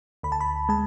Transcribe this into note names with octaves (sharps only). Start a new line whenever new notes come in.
D2 B5
A5
B5
G#3 A5